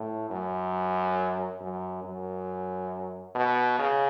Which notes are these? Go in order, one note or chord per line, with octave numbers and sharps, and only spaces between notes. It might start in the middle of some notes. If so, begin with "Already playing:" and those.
Already playing: A2
F#2
F#2
F#2
B2
C#3